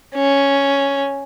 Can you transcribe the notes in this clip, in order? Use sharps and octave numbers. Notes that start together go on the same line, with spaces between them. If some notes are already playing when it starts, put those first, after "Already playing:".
C#4